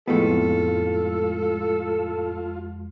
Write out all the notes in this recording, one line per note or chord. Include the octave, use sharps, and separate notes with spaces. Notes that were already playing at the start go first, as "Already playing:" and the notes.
F2 A2 G#3 B3 F4 A4